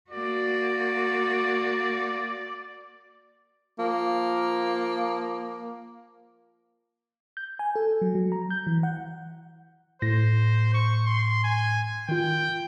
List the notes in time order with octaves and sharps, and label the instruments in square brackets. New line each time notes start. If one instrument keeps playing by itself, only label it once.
[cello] A#3 F#4 [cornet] D5
[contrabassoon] F3 [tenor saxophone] A#3
[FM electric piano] G6
G#5
A4
F#3
F#3
A#5
G6
E3
F#5
[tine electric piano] A2 A#6 [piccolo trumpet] C5
[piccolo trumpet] C#6
C6
G#5
[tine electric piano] D#3 F4 [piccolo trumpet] G5